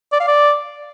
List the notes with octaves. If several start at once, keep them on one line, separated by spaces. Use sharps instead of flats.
D5
F5
D5